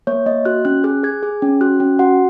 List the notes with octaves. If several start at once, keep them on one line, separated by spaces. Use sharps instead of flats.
A#3 C#5
A#3 D#5
F#4 F#6
C#4 F#6
G#4 F#6
G#4 G#6
G#4
C#4
F#4 F#6
C#4
F#4 F#5